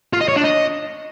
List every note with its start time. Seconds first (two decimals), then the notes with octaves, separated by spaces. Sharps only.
0.13 F4
0.21 D#5
0.29 C#5
0.36 D4
0.44 D#5